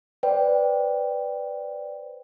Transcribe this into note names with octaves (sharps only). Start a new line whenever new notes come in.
B4 C5 D5 G5